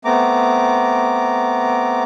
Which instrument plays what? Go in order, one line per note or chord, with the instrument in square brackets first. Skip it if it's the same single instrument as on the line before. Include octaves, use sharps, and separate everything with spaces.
[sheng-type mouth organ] A3 B3 C4 A#5 D6